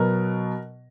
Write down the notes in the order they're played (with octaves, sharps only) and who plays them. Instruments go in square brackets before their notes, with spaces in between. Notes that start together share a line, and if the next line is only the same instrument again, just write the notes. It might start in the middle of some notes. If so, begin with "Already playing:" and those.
Already playing: [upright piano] B2 F#3 B3 A#4